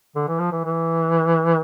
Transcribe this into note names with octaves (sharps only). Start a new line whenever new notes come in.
D3
E3
F3
E3
E3